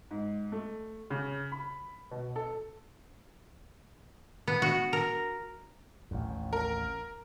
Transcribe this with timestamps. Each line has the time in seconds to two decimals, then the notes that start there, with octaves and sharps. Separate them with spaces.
0.11 G#2
0.52 A3
1.10 C#3
1.52 B5
2.11 B2
2.36 A4
4.48 B3
4.62 F#4
4.93 A#4
6.11 A1 D#2
6.53 A#4